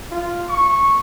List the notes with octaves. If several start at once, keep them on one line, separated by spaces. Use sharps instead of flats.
F4
C#6